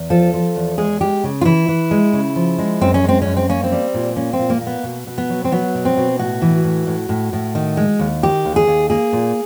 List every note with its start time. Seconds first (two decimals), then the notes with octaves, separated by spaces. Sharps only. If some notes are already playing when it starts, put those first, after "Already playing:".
Already playing: E2
0.10 F3 A4
0.33 F3
0.55 E2
0.78 G#3 G#4
1.01 G#3 G4
1.24 C#3
1.41 F4
1.45 E3 E4
1.68 E3
1.91 G#3
2.13 C#3
2.36 F3
2.59 G#3
2.81 F#2 C4
2.94 C#4
3.04 G#3 C4
3.22 F#2 C#4
3.37 C4
3.49 A#3 C#4
3.64 C4
3.72 G3
3.94 A#2
4.16 A#3 C#4
4.33 C4
4.39 A#2
4.50 A#3
4.61 A#3
4.67 B3
4.83 B2
5.07 B2
5.18 B3
5.29 F#3
5.45 C4
5.52 F#3 B3
5.75 B2
5.85 C4
5.97 B2
6.19 A2 F#4
6.42 E3
6.64 A2
6.87 A2
7.09 A2
7.33 A2
7.55 D#3
7.77 G#3
7.99 D#2
8.23 D#3 G4
8.45 D#2
8.56 G#4
8.67 D#2
8.90 A#3 G#4
9.13 A#2